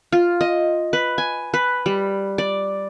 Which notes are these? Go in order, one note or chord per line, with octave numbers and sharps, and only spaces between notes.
F4
D#5
B4
G#5
B4
G3
D5